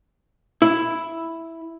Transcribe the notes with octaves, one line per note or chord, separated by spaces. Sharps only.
E4